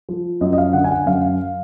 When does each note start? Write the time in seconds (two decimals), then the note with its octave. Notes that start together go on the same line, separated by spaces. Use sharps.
0.09 F3
0.41 F#2 D#5
0.53 D#5
0.58 F5
0.73 D3 F#5
0.84 G#5
0.91 F#5
1.06 F#2 F5